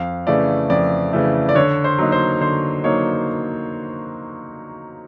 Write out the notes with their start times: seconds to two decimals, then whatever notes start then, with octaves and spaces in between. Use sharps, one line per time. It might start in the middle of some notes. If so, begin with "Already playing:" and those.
Already playing: F2 F5
0.27 C#3 E3 A3 D5
0.70 F2 D5
1.13 C#3 E3 A3
1.49 D5
1.55 D3 C#5
1.84 C5
1.98 F#3 A#3 D#4
2.12 C5
2.41 D3 C5
2.84 F#3 A#3 D#4 C#5